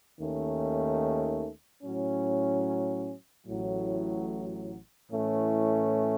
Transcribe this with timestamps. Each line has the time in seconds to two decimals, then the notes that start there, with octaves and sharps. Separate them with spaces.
0.18 D#2 D#3 A3 C#4
1.82 A2 F#3 C#4
3.46 A1 A2 F#3
5.10 A2 E3 A3 C#4